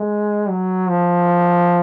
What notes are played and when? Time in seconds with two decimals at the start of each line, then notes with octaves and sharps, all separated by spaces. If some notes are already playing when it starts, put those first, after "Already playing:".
Already playing: G#3
0.49 F#3
0.89 F3